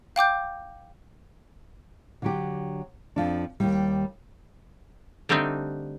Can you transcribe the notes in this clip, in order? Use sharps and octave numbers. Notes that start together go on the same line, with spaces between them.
F5 G5 D6 G6
D3 F#3 G4
F2 F3 D4
D#2 G#2 G3
D3 G3 A3 C4 D4 D#4